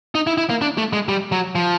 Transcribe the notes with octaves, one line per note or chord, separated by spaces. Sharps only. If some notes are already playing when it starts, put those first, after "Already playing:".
D#4
E4
E4
A#3
D4
A3
G#3
G3
F#3
F3